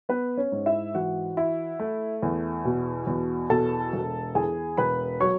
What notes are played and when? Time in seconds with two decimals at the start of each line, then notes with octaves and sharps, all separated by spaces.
0.09 B3 B4
0.37 C#4 C#5
0.52 G#2
0.66 E4 E5
0.94 E3 F#4 F#5
1.37 E4
1.79 A3
2.23 E2
2.65 B2
3.07 E2
3.50 B2 A4 A5
3.93 E1
4.35 E2 G#4 G#5
4.77 E1 B4 B5
5.20 F#3 C#5 C#6